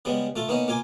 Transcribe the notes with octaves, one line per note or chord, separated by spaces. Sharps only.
C#3 G3 G#3 B3
A3 F4 A4
A#3 B3 C#4 D#4 D#5
A#3 F4 G#5 D6